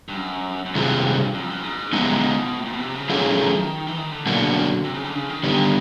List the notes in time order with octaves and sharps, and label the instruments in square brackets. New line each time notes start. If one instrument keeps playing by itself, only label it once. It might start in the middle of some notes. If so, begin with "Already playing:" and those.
[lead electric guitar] G2
F#2
F#2
[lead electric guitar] G2 [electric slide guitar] C3 D#3 G#3 C4 F4
[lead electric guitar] F#2
F2
F#2
G#2
[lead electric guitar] F#2 [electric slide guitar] G#3 B3 D#4
[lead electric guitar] G2
C3
B2
A2
A#2
B2
C3
C#3
[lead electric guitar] D3 [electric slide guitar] F#3 A3 C#4 F4 G#4
[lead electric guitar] D#3
E3
D#3
E3
D#3
D3
[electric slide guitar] B2 F#3 A#3 D4 F#4
[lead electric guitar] C3
C#3
D3
C#3
D#3
[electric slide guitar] D3 G3 B3 [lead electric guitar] D#3